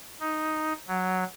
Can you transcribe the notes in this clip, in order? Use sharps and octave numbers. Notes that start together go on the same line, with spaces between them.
D#4
F#3